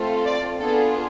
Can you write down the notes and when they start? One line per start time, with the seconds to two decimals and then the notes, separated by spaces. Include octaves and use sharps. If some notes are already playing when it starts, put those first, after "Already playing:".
Already playing: A3 C4 F4 A4
0.25 D5
0.59 B3 D4 F4 G#4 A4